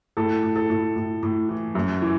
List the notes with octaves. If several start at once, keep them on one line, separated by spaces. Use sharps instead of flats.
A2 A4
A2
A4
A2
A2
A2
E3
F#2
E3